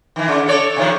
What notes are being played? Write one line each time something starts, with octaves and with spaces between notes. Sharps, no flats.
D#3 E3
C#3
A4 C#5 D5
C3 D#3 F3